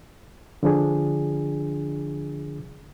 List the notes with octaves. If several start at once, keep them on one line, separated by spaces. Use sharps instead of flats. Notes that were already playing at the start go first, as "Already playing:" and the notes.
D3 F3 D4 G#4